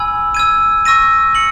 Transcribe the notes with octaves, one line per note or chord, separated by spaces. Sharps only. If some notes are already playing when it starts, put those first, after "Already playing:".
Already playing: G#5 B5 E6 G#6
E6 G#6 D#7
C#6 E6 A#6 D#7
C#7 F#7